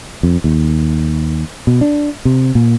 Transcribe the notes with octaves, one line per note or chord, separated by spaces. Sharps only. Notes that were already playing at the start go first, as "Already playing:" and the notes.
F2
D#2
B2
D4
C3
A#2